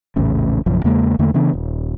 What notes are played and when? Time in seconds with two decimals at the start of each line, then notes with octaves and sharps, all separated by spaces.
0.16 A#1 E2 A2 C#3
0.66 A#1 F#2 C#3 F3
0.84 E2 C#3 G#3 A#3
1.19 E2 D3 A3 A#3
1.34 C#3 E3 B3 D4
1.53 D#1